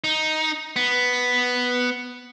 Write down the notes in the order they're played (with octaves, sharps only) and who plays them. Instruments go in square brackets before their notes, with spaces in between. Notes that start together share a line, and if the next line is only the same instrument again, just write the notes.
[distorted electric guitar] D#4
B3